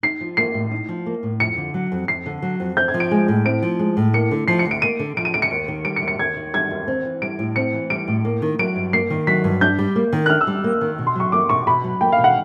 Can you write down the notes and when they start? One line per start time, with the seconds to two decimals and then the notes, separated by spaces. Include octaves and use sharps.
0.03 D#4 C7
0.21 F3
0.37 A#3 C7
0.54 A2
0.71 D#4
0.89 F3
1.06 A#3
1.23 A2
1.40 F2 C#7
1.57 D3
1.74 F#3
1.92 F2
2.08 F2 C7
2.26 D3
2.42 F#3
2.60 F2
2.77 C4 G6
2.88 G#6
2.94 F3
3.00 D7
3.11 G#3
3.28 A2
3.45 C4 D7
3.62 F3
3.79 G#3
3.97 A2
4.14 A#3 C#7
4.31 D3
4.48 F3 C7
4.59 C#7
4.65 D2
4.71 D7
4.82 A#3 D#7
4.99 D3
5.17 F3 D7
5.25 D#7
5.34 D2 D7
5.42 C#7
5.51 D#2
5.68 D#3
5.85 G3 D7
5.96 C#7
6.03 D#2
6.08 C#7
6.19 D#2 G#6
6.36 D#3
6.53 G3 G#6
6.70 D#2
6.88 C4
7.05 E3
7.22 G3 D7
7.39 A2
7.56 C4 C#7
7.74 E3
7.90 G3 D7
8.08 A2
8.25 A#3
8.42 D#3
8.59 F#3 D7
8.76 G2
8.93 A#3 C7
9.10 D#3
9.27 F#3 B6
9.44 G2
9.61 D4 G6
9.79 G3
9.96 A#3
10.13 D#3
10.26 F#6
10.30 D4 F6
10.41 E6
10.47 G3
10.64 A#3
10.81 D#3
10.99 B2
11.07 C6
11.15 F#3 C#6
11.32 A#3 D6
11.49 B2 C#6
11.67 B2 B5
11.84 F#3
12.01 A#3 G5
12.12 F5
12.18 B2
12.24 F#5